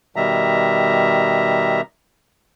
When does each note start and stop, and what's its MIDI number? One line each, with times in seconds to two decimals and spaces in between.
0.16 1.81 47
0.16 1.81 51
0.16 1.81 55
0.16 1.81 76
0.16 1.81 82